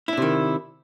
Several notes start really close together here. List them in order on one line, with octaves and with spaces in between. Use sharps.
E4 D4 C3 D#3